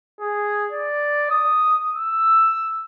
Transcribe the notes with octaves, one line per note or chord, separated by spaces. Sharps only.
G#4
D5
D#6
E6